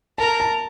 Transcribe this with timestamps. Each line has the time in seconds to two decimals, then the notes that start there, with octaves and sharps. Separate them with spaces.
0.18 A#4 A5
0.40 A5